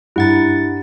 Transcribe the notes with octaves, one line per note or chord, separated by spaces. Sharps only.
G2 E4 F#5 A#5 A6